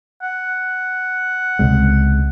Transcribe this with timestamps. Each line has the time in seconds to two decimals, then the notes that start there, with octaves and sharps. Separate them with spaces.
0.23 F#5
1.59 C#2 C3 G#3